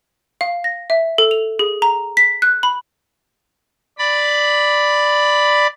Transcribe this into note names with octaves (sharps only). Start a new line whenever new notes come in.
F5
A#6
E5
A4
F7
G#4
A#5
B6
F#6
B5
D5 B5